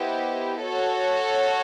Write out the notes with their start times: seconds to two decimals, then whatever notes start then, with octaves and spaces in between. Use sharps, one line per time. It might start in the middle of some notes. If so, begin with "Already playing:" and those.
Already playing: B3 E4 G4 C5 D#5
0.61 F#4 A4 C#5